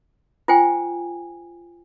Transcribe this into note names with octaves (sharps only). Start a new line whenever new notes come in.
F4 C5 G5 G#5